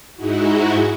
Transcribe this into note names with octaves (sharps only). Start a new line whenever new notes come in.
G#2 G#3 D#4 E4 F#4